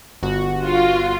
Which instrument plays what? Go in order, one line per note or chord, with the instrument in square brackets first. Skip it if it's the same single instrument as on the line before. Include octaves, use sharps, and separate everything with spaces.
[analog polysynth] G1 F#4
[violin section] F4